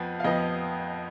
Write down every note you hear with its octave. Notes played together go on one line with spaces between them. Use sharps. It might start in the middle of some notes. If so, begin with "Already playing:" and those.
Already playing: F2 F3 B3
F5
F2 F3 B3 D#5